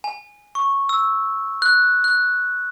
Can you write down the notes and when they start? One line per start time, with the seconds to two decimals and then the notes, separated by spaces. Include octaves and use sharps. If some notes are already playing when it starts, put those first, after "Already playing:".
0.04 G#5
0.55 C#6
0.89 E6
1.62 F#6
2.04 F#6